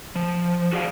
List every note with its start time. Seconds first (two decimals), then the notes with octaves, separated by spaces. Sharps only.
0.16 F3
0.72 F#4 G#4 D5 F5